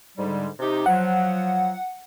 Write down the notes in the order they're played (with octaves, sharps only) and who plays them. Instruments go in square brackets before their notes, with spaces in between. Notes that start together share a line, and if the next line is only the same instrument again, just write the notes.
[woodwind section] G#2 D3 G3
C3 D#4 G4
[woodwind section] F3 F#3 [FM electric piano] F#5